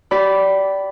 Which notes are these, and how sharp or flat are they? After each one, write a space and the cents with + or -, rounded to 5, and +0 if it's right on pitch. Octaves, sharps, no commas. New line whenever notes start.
G4 -25 D5 -15 B5 +0